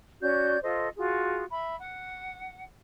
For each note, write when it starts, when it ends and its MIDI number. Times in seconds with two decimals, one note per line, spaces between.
0.20 0.57 61
0.20 0.57 66
0.20 0.57 74
0.20 0.57 91
0.62 0.88 65
0.62 0.88 69
0.62 0.88 72
0.62 0.88 75
0.97 1.44 65
0.97 1.44 66
0.97 1.44 68
1.51 1.75 76
1.51 1.75 83
1.81 2.64 78